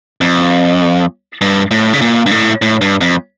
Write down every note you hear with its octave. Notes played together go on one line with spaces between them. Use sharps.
F2
G2
A2
C#3
A#2
G2
A2
A2
G2
F2